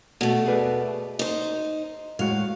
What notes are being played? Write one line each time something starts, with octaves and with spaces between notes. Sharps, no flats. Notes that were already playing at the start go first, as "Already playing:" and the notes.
B2 A3
G#4 B4 D5
D#4 C5
A2 G#3 F#4 F5